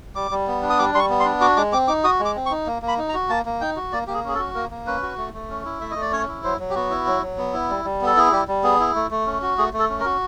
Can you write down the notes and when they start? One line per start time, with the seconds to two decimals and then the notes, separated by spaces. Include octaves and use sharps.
0.15 G3 D6
0.31 G3
0.47 B3
0.63 D4
0.70 D#6
0.79 G3 D6
0.94 G3 C6
0.99 C#6
1.10 B3
1.20 C6
1.25 D4
1.41 F#4 D6
1.57 G#3 D6
1.72 C4 D6
1.88 D#4 D6
2.04 F#4 D#6
2.20 G#3
2.25 D6
2.36 C4
2.46 C#6
2.51 D#4
2.67 A#3
2.82 A#3
2.88 B5
2.98 D#4
3.09 A#5
3.14 F#4
3.30 A#3 A5
3.45 A#3
3.61 D#4 G5
3.76 F#4
3.92 A#3 D5
4.07 A#3 G4
4.14 G#4
4.24 C#4 G#4
4.35 A4
4.39 F#4
4.55 A#3 A#4
4.71 A#3
4.87 C#4 B4
5.03 F#4
5.18 A3
5.34 A3
5.50 C#4
5.65 E4
5.81 A3 E5
5.91 D#5
5.96 A3
6.02 D5
6.12 C#4 C#5
6.28 E4
6.44 F#3 C5
6.60 F#3
6.70 G4
6.75 B3 F#4
6.90 E4
7.07 F#3
7.22 F#3
7.38 B3
7.53 E4
7.70 G3
7.85 G3
8.01 B3 A4
8.17 E4 G#4
8.32 G3 G4
8.48 G3
8.64 B3 G#4
8.80 E4
8.95 A3
9.11 A3
9.27 C#4
9.42 F#4
9.58 A3 G#4
9.73 A3
9.79 A4
9.89 C#4
10.00 A#4
10.05 F#4